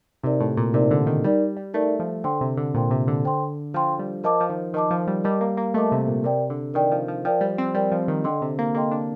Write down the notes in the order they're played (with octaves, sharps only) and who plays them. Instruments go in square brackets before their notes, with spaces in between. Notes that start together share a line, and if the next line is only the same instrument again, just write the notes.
[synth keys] C3 [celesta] D#4 A#4 D5
[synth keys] A2
A#2
[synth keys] C3 [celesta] D#4 A#4 D5
[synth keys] D3
D#3
[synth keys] G3 [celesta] D#4 A#4 D5
[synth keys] G3
[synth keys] A3 [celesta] D#4 A#4 D5
[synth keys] F3
[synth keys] D3 [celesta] C5 G5 C6
[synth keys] C3
D3
[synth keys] A#2 [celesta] C5 G5 C6
[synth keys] C3
D3
[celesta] C5 G5 C6
[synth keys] F3 [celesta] C5 G5 C6
[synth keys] G3
[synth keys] F3 [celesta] A#4 D#5 A5 D6
[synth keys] F3
D#3
[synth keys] D#3 [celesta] A#4 D#5 A5 D6
[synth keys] F3
G3
[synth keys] G3 [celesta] A#4 D#5 A5 D6
[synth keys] A#3
A#3
[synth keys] A3 [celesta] A#4 D#5 A5 D6
[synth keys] C3
A#2
[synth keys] C3 [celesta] A#4 D5 G5
[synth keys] D3
[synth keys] D#3 [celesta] A#4 D5 G5
[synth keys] F3
F3
[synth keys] F3 [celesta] A#4 D5 G5
[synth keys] G3
C4
[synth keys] G3 [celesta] A#4 D5 G5
[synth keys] F3
D#3
[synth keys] D3 [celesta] A4 D#5 G5 C6
[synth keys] C3
A#3
[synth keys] A#3 [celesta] A4 D#5 G5 C6
[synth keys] D4